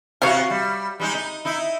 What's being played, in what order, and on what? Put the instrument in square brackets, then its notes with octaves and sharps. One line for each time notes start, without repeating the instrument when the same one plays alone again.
[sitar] C3 F#4 [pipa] C#5 F5
[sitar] G3
G3 G#3 D#4
D#4
D#4 E4